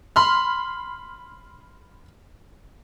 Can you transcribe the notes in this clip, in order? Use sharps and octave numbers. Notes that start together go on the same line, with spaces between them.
B5 C6 F6